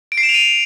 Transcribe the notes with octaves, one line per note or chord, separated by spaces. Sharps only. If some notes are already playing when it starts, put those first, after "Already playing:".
D7
C7
E7
F7
D#7